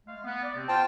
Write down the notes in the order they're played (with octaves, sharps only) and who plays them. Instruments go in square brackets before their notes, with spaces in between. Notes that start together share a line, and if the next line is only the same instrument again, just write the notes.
[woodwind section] G#3 A3 F5
B3
D5
C3 C4
[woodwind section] B3 F4 [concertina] C5 G5 A5